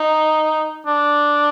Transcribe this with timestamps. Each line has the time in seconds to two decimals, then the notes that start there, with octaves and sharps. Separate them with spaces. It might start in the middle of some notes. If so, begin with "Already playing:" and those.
Already playing: D#4
0.86 D4